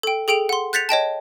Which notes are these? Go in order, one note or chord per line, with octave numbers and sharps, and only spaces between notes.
A4 G5
G#4 A4 G5 D7 F7
F#5 C6
F#6 G6 A6 B6 C#7 F7
C#5 D#5 G5 A5